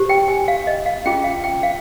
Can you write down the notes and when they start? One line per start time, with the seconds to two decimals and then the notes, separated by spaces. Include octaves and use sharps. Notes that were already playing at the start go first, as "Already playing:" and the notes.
Already playing: G4 C5
0.09 G5
0.28 G#5
0.48 F5
0.67 D#5
0.86 F5
1.06 C#4 F4 G#4 G5
1.24 F5
1.44 G5
1.63 F5